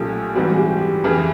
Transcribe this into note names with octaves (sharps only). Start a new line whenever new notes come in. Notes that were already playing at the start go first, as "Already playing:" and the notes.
Already playing: B1 A#2 F3 A3 C#4 G4
G#2 E3 G3 C4 F#4
G#4
G4
G4
F2 C#3 E3 G#4